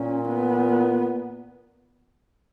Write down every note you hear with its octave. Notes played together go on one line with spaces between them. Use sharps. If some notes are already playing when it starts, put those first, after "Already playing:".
Already playing: A#2 C#4
B3